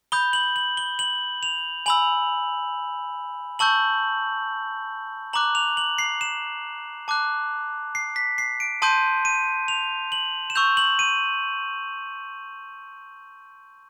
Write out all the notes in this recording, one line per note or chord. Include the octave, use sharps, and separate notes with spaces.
B5 D#6 G6 G7
F#7
F#7
G7
F#7
F7
G#5 B5 E6 F#7
A5 C#6 E6 G6 F#7
A#5 D6 F#6 F#7
F7
F#7
C7
E7
A5 D6 F#6
C7
B6
C7
D7
A5 C6 D#6 G6 D#7
D#7
F7
F#7
E7
C#6 E6 G6 F7
F#7
D#7